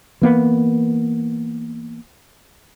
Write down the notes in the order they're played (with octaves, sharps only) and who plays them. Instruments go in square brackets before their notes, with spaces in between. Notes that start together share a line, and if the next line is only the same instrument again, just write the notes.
[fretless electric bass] E3 A#3 B3